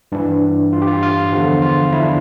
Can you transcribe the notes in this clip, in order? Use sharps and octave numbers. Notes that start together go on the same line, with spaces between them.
G2 E3 D4
F4
G4
F4
F4
E2 D3 F3
F4
E4
D4